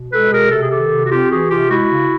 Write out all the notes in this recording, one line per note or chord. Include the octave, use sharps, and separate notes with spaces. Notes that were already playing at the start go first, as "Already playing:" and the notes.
Already playing: B2
G#3 A4 B4
B2 G#4 A#4
C3 A4
G#4
D#3 G4 A4
C3
F#4
C4 F4 G4
E3 F#4 G#4
C3 F4 G4
G#3 E4 F#4
C#3